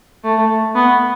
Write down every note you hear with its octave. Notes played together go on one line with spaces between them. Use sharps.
A3
B3